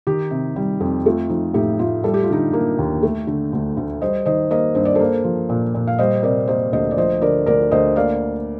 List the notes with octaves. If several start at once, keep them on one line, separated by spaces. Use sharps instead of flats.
D#3 D#4 G4
C3
G3
F2
A3 F4
F3 D#4
A2 D#4 G4
A2 F4
G3 A4
G4
F4
D3 D#4 G4
A#3
D#2
A3
D3
D2
D2
G3 C5 D#5
D#3 C5 D#5
A#3 C5 D#5
G2 C5
D5
A#3 A4 C5
F3
A#2
A#2
F5
G3 C5 D#5
C3 A#4 D5
A#3 C5 D#5
D2 C5 D#5
D5
F3 C5 D#5
D3 A#4 D5
D2 A#4 D5
D2 C5 D#5
A#3 D5 F5